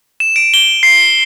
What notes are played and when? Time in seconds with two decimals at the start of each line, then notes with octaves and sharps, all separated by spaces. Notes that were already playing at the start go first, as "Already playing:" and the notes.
0.20 E7
0.36 D7
0.54 G7
0.83 C7